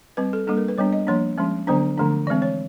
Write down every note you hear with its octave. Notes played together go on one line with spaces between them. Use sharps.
G3 C4 B4
A4
G3 A#3 D4 A4
A#4
B4
G3 B3 D4 C#5
D#5
F3 A#3 D4 C#5
F3 G#3 C#4
D3 F#3 B3 D4 C5
D3 F3 A3 D4
E3 G#3 C4 D5
C#5